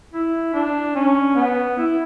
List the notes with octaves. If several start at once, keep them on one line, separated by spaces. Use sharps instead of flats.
E4
D4
C#4
B3
E4